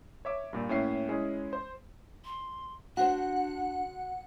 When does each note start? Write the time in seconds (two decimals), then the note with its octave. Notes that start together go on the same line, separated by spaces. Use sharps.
0.25 C#5 E5 D6
0.53 G2 A#2
0.69 A2 A#3 C#4 E5 C7
1.09 G#3 C#4 E4 G#4
1.53 C5
2.25 C6
2.97 D4 F#4 C5 F#5